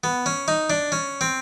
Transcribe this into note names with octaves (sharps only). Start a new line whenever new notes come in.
B3
C#4
D#4
D4
C#4
C4